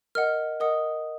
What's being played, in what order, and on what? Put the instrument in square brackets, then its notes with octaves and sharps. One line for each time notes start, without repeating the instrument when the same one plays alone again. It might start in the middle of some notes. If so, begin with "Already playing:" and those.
[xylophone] A#4 D#5 F#5 F6
A#4 D#5 F#5 D#6